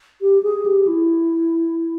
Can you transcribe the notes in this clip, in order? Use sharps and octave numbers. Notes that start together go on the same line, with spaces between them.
G4
G#4
G4
E4